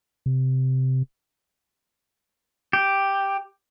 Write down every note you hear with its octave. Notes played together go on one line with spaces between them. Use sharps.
C3
G4